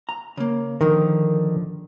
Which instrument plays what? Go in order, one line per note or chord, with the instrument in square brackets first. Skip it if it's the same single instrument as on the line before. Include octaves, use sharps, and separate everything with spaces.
[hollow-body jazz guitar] A#5
C#3 A#3
[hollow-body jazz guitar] D3 F3 A#4 [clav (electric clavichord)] D#3